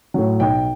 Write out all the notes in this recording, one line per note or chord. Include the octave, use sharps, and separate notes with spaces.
A2 F#3
B1 G5